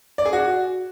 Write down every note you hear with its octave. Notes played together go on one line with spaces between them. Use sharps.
D5
G#4
F#4